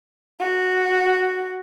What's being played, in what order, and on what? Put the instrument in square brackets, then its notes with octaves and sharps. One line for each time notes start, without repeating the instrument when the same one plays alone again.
[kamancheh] F#4